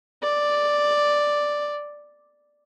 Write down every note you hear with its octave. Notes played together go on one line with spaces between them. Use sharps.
D5